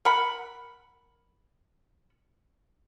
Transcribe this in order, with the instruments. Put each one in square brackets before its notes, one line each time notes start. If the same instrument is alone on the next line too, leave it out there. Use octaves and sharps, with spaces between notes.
[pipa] A#4 F#5 B5